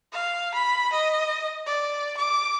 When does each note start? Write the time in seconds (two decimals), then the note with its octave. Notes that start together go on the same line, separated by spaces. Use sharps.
0.13 F5
0.54 B5
0.93 D#5
1.66 D5
2.17 D6